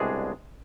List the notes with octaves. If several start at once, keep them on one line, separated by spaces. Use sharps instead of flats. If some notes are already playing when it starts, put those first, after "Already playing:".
Already playing: C2 B2 G#3 D4 G#4